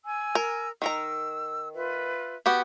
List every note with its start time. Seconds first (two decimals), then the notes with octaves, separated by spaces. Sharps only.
0.05 G#5 E6
0.35 A#4
0.82 D#3 A#4 A#5 E6
1.74 F4 B4 E5
2.46 B3 F#4 G4